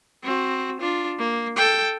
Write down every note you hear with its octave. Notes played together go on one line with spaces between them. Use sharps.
C4 F#4
D4 F4
A#3
A4 G5